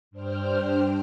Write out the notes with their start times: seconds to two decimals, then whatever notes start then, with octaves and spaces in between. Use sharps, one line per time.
0.11 G2 D4 C5 G5 F6